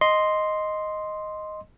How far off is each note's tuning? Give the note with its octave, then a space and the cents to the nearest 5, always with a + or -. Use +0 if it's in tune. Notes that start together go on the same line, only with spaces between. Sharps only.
D#5 +0 C6 +0